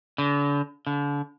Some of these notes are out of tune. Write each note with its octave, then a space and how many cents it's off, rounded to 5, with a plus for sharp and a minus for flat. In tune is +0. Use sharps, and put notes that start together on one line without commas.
D3 -40
D3 -35